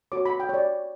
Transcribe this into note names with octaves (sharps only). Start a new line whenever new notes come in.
F#4 C#5 D6
B5
G5
C#5
D5